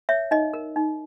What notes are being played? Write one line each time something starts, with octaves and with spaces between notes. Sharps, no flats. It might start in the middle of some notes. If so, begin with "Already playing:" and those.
C#5 E5
D#4 D#5
A#4
D#4